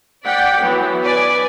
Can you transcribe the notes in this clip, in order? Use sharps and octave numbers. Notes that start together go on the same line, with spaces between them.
D5 F#5 G5 B6
E3 F#3 B3
B4 D5 G#5